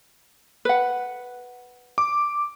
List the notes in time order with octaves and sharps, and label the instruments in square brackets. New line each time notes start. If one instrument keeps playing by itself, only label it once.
[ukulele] B4 F#5
[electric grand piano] D6